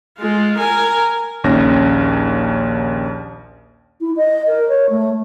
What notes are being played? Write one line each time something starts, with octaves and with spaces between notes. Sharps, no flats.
G#3 F4
A#4 G#5
A#1 D#2 C#4 A#6
E4
D#5
A#4
C#5
A3